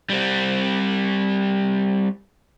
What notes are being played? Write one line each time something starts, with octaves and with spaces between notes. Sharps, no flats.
G3 C4